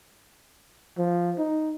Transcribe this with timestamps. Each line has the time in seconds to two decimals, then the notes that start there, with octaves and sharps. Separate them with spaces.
0.98 F3
1.38 D#4